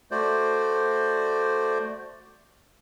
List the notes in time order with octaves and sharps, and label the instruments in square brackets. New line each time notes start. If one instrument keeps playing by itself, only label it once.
[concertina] A3 F#4 C5 D5